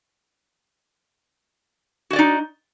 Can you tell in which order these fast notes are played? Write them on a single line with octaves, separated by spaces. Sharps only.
F#4 D#5 D5 D#4